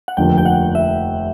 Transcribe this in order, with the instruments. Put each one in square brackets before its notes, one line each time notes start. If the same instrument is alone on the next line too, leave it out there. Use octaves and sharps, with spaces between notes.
[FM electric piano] F#5
[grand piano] F1 D#2 D3 F3 A#3 [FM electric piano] G5
[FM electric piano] G5
F#5
E5